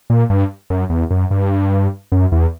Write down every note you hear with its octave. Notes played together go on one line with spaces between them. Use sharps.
A#2
G2
F#2
E2
F#2
G2
F#2
E2